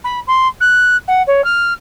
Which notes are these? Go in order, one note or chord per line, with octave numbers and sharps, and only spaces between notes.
B5
C6
F#6
F#5
C#5
F6